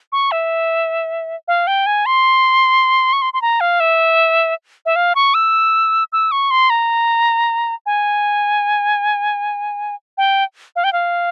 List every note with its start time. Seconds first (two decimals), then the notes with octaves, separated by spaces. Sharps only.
0.12 C#6
0.32 E5
1.48 F5
1.67 G5
1.86 G#5
2.06 C6
3.13 C#6
3.22 C6
3.34 C6
3.42 A#5
3.61 F5
3.80 E5
4.86 E5
4.96 F5
5.15 C#6
5.34 E6
6.12 E6
6.32 C#6
6.51 C6
6.70 A#5
7.86 G#5
10.18 G5
10.76 F5
10.84 G5
10.93 F5